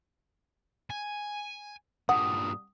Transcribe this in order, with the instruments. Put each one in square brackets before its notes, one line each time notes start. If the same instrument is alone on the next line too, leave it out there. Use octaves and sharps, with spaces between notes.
[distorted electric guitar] G#5
[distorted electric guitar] G2 A#2 [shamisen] F#5 [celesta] D#6